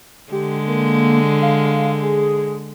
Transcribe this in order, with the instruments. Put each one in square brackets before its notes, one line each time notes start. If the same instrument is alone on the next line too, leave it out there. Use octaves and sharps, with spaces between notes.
[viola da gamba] D3 G#3 [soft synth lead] G4
[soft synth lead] A#3
F5
G#4